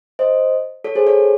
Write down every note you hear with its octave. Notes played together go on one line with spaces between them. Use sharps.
C5 D#5
A4 C#5
G#4 C5
A4 C#5